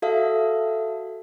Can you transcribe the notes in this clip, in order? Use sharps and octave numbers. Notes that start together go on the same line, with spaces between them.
F#4 A4 E5 F5